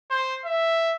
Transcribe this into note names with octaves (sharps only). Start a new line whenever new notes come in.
C5
E5